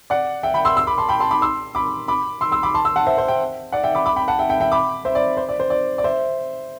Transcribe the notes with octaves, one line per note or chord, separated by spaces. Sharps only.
D5 F#5
E5 G5
G5 B5
C6 E6
C6 E6
B5 D6
A5 C6
G5 B5
A5 C6
B5 D6
C6 E6
B5 D6
B5 D6
C6 E6
C6 E6
B5 D6
A5 C6
C6 E6
F#5 A5
C5 E5
C5 E5
E5 G5
D5 F#5
E5 G5
B5 D6
B5 D6
G5 B5
F#5 A5
E5 G5
E5 G5
E5 G5
B5 D6
C5 E5
D5
C5
D5
C5
D5
D5
C5 E5